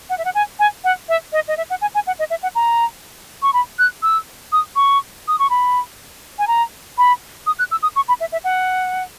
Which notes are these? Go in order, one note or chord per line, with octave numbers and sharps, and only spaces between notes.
F#5
E5
F#5
G#5
G#5
F#5
E5
D#5
D#5
E5
F#5
G#5
G#5
F#5
D#5
E5
F#5
A#5
C#6
B5
F#6
E6
D#6
C#6
D#6
C#6
B5
G#5
A#5
B5
D#6
F#6
E6
D#6
C#6
B5
E5
E5
F#5